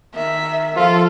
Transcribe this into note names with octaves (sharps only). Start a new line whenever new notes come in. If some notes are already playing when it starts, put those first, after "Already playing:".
D#3 E5
F3 F4 A4